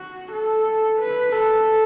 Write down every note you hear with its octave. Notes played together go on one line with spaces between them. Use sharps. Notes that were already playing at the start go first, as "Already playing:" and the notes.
Already playing: F#4
A4
B4
A4